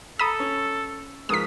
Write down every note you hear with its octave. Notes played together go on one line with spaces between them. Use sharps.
A4 A#5 B5 D#6 B6
C#4
G#2 F3 A#4 D#6 B6